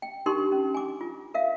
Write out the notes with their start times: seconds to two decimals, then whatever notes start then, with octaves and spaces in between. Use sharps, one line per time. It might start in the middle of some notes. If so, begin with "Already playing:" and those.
0.02 G5
0.26 D4 D#4 G4 A#4 C6
0.52 C#4
0.75 G#5 D6
1.01 F4
1.34 A#4 E5 F5